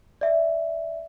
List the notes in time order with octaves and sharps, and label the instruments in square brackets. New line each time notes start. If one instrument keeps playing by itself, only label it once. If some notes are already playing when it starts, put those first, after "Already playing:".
[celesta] D5 E5